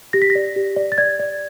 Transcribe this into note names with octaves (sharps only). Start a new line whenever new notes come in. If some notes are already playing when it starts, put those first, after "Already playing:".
G4 A#6
B6
A#6
D5
G4
D5
A6
D5 G#6
D5